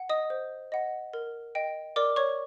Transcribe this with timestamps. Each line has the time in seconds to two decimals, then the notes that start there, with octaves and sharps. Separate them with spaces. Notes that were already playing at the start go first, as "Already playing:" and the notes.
Already playing: F#5
0.09 D#5 D#6
0.30 C5
0.72 D#5 F#5
1.14 A#4
1.55 D#5 G5
1.96 A#4 D5 D6
2.16 C#5 C#6